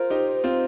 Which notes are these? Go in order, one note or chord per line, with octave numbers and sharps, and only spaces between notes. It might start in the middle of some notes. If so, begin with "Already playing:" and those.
Already playing: F4 A#4 C5
D#4 G4
C4 F4